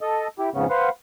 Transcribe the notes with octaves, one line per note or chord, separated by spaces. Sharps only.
A4 D#5
E4 G4
F2 G#2 C#3 B3 C#4
B4 C5 F5 F#5